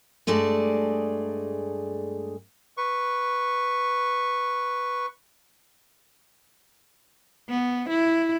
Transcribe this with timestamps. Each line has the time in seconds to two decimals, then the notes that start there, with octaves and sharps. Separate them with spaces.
0.27 G2 G#3 A3 G#4 D5 A5
2.77 B4 C#6
7.49 B3
7.89 E4